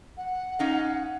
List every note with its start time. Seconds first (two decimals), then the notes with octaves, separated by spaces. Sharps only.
0.17 F#5
0.59 C#4 D#4 F5